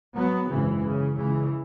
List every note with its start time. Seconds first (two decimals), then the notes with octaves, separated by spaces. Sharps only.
0.16 F#3 B3
0.49 G#1 F#2 C#3 E3
0.83 C#3
1.16 C#2 C#3 E3